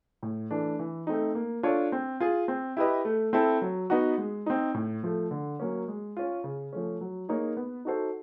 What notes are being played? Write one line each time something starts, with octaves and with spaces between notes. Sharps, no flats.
A2
E3 A3 D4
E3
A3 C4 D#4
A#3
D4 F4 A4 C#5
C4
F4 G#4
C4
E4 G4 B4 D#5
A3
C4 E4 A4
F#3
B3 D#4 F#4
G#3
C4 D#4
A2
F3 A3
D3
F#3 A#3 C#4
G#3
C#4 F4
C#3
F3 A3 C#4
F#3
A#3 D#4 G#4 C#5
B3
D#4 F#4 A4 C5